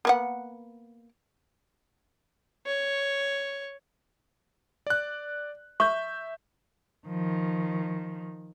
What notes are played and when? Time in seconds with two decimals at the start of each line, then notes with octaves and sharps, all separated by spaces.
0.05 A#3 B3 F#5
2.66 C#5
4.87 D5 F#6
5.80 E5 C#6 G6
7.07 D#3 F3